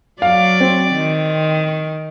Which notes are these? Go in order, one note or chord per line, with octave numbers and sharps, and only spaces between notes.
F#3 D5 F5
C4
D#3